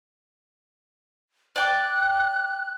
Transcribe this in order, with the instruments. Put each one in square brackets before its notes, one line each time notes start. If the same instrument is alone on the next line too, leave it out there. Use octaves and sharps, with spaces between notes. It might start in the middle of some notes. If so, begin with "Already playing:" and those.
[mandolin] D5 G5 D6 [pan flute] F#6